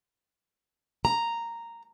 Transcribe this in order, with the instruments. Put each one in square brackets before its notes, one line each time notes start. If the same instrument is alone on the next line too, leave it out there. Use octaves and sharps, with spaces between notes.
[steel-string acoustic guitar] A#5